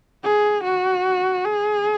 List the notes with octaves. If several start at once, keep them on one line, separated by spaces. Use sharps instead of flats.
G#4
F#4
G#4